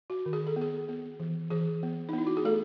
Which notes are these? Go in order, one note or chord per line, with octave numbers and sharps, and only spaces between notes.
F#4
D#3
G#4
A4
B3
G#4
B3
E3
E3 G#4
B3
D#4
B3 E4
F#4
G#4
A3 A4